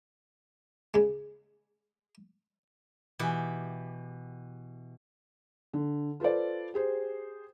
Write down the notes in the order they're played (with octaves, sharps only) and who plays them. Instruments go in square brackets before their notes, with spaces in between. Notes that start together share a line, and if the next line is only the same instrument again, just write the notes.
[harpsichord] C#3 G#3
[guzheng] B2 E3 G4
[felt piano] D3
F4 A4 B4 C5 D5
G4 G#4 C5